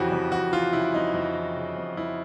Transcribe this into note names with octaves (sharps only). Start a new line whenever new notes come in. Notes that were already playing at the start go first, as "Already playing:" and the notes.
Already playing: F2 C#3 E3 F#4 G4
F2
F2 F#4
E3 F4
C#3 E4
F2 D#4
F2
E3
C#3
F2
F2 E4